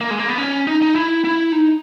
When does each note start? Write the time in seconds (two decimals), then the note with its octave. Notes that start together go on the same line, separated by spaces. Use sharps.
0.01 A#3
0.10 G#3
0.19 A#3
0.28 B3
0.38 C#4
0.67 D#4
0.82 D#4
0.95 E4
1.24 E4
1.52 D#4